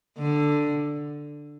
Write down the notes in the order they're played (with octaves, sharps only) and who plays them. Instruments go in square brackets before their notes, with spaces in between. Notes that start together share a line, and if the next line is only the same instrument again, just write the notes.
[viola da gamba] D3